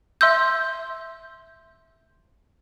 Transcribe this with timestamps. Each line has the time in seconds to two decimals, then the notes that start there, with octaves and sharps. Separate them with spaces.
0.21 E5 C6 E6 G6